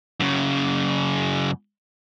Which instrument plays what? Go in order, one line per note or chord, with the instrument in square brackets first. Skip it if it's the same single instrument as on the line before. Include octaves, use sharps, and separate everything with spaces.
[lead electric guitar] F#2 C#3